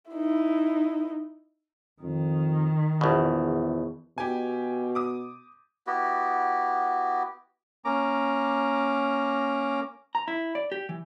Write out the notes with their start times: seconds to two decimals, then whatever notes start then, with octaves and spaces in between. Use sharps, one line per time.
0.10 D#4 E4
2.02 F2 D#3
3.01 A#1 E2 B2
4.18 B2 G4 G#5
4.95 D6 D#6
5.87 B3 E4 F#4 G4
7.85 A#3 C#4 A#5 D6
10.15 A#5
10.28 E4
10.55 D5
10.72 G4
10.89 E3